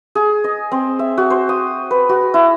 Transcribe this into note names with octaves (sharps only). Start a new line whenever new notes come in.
G#4
D#5
C4
E5
F#4
C5
D#6
B4
F#4
E4